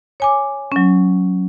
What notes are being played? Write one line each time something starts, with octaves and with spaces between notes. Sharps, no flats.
C#5 G#5 D6
F#3 C#4